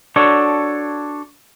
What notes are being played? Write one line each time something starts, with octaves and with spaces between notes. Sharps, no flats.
D4 F#4 A4 C#5